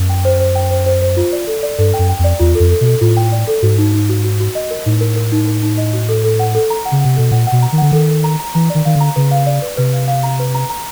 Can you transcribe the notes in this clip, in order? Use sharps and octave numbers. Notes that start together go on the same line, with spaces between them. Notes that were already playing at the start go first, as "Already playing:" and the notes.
Already playing: F#2
G5
C5
C5
G5
C5
C5
C5
F4
D5
A4
D5
G2 A4
G5
F#2
G5
F2
D5
E2 F4
F2 A4
A4
B2
A4
A2 F4
G5
D5
A4
G#2 F#4
D#4
D#4
F#4
F#4
F#4
D#5
A#4
A2 D#4
A#4
A#4
D#4
A#4
D#4
D#5
F#4
A4
A4
F#5
A4
A#5
F#5
C#3
C3 F#5
B2 A4
A#2 F#5
F#5
B2
A#5
D#3
D3 F#5
D#3 A4
A4
A#5
A#5
E3 A#5
D#3 D5
D#3 F5
D3
A#5
C#3 B4
F5
D5
B4
C3 B4
F5
F5
A#5
B4
A#5
A#5